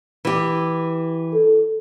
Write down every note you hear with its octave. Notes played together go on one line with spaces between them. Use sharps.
E3 G4
A4